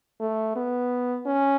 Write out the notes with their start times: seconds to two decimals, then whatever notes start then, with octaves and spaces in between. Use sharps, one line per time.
0.20 A3
0.56 B3
1.26 C#4